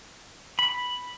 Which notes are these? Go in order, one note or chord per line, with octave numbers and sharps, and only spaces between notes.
B5